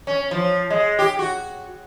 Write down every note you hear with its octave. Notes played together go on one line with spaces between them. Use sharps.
C#4
F3
G#3
G4
F#4